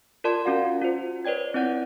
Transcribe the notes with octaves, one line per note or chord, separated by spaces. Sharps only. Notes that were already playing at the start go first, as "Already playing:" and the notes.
F4 A#4 D5 A5 C6 G#6
C#4 F4 F#4 F5 F#5
F4 C5
B4 C#5 D5 G5 G#6
C4 E4 D5 F#5 G6